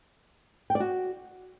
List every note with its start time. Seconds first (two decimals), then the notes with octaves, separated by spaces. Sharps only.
0.70 G5
0.75 D5
0.80 F#4